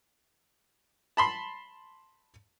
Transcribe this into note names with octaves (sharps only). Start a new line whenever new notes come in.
A5 B5 C6